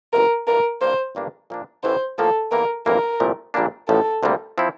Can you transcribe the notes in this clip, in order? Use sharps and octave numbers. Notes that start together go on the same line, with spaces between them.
G1 F2 C3 A#4
G2 E3 A#3 D4 F4 A#4
G2 E3 A#3 C5
G1 G2 E3 A#3 D4
A#2 F3 A#3 D4
A1 A2 E3 C5
A2 F3 A#3 F4 A4
E2 E3 A#3 A#4
G1 F2 E3 A#3 A#4
C2 A#2 F3 A3
A#1 A#2 G3 A#3 D4
A1 A2 F3 A4
D2 C3 G3 A#3
F3 C4 E4